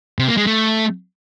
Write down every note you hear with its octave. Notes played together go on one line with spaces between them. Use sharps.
C3
A#3
G#3
A3